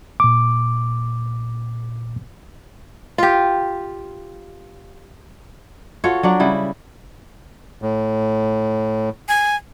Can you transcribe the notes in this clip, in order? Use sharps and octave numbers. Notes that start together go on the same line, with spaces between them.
A#2 D6
F4 G4
F4 F#4 A4 C#5
F#3 D4 D5
C#3 G3 E4
A2
G#5